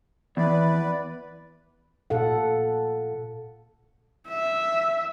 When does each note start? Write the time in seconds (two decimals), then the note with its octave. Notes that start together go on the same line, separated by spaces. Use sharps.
0.37 E2 B4 D5
2.10 A#2 A4 F5 F#5
4.29 E5